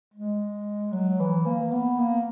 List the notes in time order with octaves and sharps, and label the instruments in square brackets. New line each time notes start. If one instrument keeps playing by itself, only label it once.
[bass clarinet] G#3
F#3
E3
A#3
B3
A#3